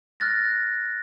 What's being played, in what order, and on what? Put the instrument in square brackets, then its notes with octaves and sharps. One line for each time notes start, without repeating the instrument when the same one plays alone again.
[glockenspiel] F6 F#6 A6 A#6